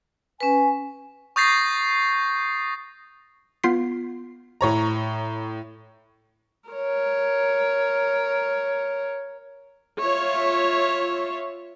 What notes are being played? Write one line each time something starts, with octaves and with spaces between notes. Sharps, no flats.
C#4 B4 G#5
C#6 D#6 G6 A6 A#6 C7
B3 F4 C7
A2 C#5 A#5
A#4 C#5
F4 C#5 E5